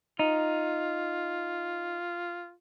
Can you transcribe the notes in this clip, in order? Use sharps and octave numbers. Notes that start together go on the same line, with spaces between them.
D#4 F4